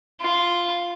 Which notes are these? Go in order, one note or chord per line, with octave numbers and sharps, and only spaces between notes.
F4